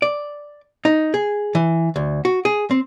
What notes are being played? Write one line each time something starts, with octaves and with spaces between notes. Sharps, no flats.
D5
D#4
G#4
E3
D2
F#4
G#4
C4